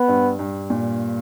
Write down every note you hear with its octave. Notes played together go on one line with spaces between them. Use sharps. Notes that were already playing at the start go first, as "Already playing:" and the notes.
Already playing: B3
G2
G2
A#2